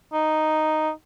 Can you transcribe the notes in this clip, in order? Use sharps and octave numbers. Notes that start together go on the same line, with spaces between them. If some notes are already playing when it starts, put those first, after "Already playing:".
D#4